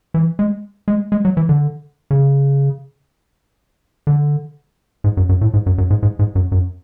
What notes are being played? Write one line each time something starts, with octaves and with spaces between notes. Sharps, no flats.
E3
G#3
G#3
G#3
F#3
E3
D3
C#3
D3
G#2
F#2
F#2
A2
G#2
F#2
F#2
G#2
G#2
G#2
F#2
F#2